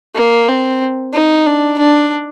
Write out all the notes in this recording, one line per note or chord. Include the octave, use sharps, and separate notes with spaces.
A#3
C4
D#4
D4
D4